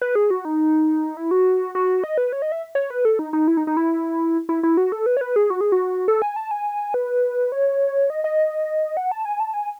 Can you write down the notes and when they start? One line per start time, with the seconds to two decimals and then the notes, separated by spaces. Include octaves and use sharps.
0.01 B4
0.15 G#4
0.30 F#4
0.45 D#4
1.17 E4
1.31 F#4
1.75 F#4
2.04 D#5
2.18 B4
2.32 C#5
2.42 D#5
2.52 E5
2.75 C#5
2.90 B4
3.05 A4
3.19 D#4
3.33 D#4
3.48 E4
3.57 D#4
3.67 D#4
3.77 E4
4.49 E4
4.63 E4
4.77 F#4
4.92 A4
5.06 B4
5.17 C#5
5.21 B4
5.36 G#4
5.50 F#4
5.61 G#4
5.72 F#4
6.08 A4
6.22 G#5
6.36 A5
6.51 G#5
6.94 B4
7.52 C#5
8.10 D#5
8.24 D#5
8.97 F#5
9.11 A5
9.25 G#5
9.40 A5
9.54 G#5